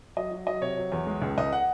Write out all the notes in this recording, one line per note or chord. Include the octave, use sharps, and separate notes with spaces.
F#3 D#5
F#3
F#3 D#5
C3 C#5
F#3
E2
G#3
C#2
C#2 D#5
F#5